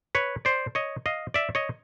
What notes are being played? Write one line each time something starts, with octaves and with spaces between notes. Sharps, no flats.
B4 C#5
C5 D5
C#5 D#5
D#5 F5
D5 E5
C#5 D#5